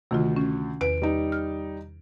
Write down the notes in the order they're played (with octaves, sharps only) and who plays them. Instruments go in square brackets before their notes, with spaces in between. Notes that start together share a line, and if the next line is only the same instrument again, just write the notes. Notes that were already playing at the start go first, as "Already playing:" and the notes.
[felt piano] D2 [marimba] C3 D#3 F4
[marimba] C#4
[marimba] E2 B4 [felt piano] D7
[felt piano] G3 D#4
[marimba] F6